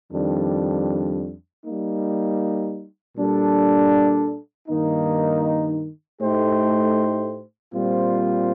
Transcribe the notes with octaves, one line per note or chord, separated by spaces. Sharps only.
F2 D#3 G3 D4
G3 A#3 D#4
A#2 G3 D4 A4
G2 D#3 A#3 D#4
A2 A3 D#4 G4 C5
A#2 G3 C4 F4 C5